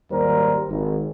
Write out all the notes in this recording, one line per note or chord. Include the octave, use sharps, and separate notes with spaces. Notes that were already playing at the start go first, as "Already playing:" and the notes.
G#1 D#2 G3 A#4 C5
G#1